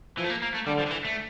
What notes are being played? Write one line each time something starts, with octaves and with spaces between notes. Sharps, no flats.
E3 F3
A3
A#3
A#3
A3
D3 G3
F3
D3
E3
A3